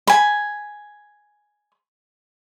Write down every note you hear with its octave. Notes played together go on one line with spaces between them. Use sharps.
G#5 B5